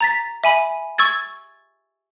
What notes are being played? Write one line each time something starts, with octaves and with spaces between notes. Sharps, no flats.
A#5 A6 B6
E5 G#5 B5
C#6 E6 G#6 A6